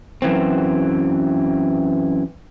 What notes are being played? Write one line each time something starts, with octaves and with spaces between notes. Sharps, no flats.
F#2 E3 C4